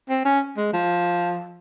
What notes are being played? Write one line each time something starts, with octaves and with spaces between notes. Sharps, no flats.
C4
C#4
G#3
F3